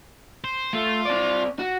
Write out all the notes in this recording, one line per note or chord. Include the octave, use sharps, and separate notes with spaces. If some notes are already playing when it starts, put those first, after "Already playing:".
C5
A3 F4
C4 D5
F#4